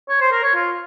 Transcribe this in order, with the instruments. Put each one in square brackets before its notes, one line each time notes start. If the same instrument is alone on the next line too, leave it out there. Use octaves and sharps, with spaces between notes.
[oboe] C#5
C5
A#4
C#5
F4